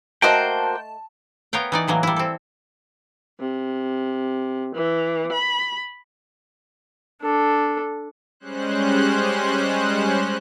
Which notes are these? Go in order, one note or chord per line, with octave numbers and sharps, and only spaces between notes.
A3 A#3 F#4 C5 D#5 G5 A5
B3 A#4 C#5 F5 G5
E3 D#4 D5
A2 E3 F#3 A#3
G3 E4
C4 A4
C3
E3
B5
D4 A4
G3 G#3 C#4 C5 F#6